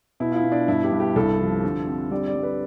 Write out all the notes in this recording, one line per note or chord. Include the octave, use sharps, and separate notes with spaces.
B2 E4
F4
E4
B2
D4
G2 E4
G4
G2
G4
C2 A4
F3
D3
C4
G3 D5
D5
G3
B4